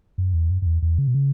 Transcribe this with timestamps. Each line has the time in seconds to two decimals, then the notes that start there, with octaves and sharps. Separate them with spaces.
0.18 F#2
0.33 E2
0.50 F#2
0.62 F#2
0.66 E2
0.82 E2
0.99 C#3
1.08 B2
1.14 C#3